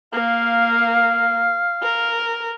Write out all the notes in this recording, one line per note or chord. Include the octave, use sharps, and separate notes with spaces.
A#3 F5
A#4